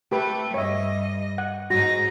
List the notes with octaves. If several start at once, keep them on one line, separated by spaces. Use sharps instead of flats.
A3 G4 B4
G2 C#5 D#5 E5
F#5
G#2 D#4 F#4 A#6